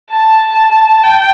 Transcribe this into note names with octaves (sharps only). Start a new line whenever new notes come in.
A5
G5